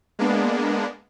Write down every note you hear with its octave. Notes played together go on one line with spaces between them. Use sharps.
G#3 A#3 B3 D4